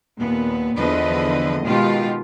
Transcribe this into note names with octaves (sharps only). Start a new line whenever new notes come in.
D#2 A#2 B3
E2 D3 F3 B4 D#5
B2 D#3 G#3 D#4 F4 G4